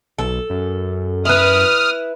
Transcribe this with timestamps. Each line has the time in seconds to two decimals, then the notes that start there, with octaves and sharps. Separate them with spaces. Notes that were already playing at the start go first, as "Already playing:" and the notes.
0.19 B1 A4
0.50 F#2
1.25 E4 B4 D#6 F6